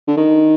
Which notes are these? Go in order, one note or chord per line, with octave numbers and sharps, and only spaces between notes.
D3
D#3